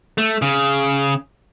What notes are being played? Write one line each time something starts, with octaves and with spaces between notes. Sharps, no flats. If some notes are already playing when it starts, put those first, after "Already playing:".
A3
C#3